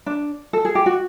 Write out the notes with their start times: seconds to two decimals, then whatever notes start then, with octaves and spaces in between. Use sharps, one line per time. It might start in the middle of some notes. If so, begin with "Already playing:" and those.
0.06 D4
0.53 A4
0.65 G#4
0.75 G4
0.86 F#4